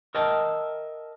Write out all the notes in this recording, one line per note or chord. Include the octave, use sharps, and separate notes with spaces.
A#4 D#5 E5 G5 A5